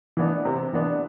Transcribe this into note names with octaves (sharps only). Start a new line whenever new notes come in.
E3 B3 D4
C3
E3 B3 D4